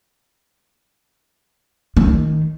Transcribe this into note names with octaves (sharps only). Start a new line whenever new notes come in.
D#3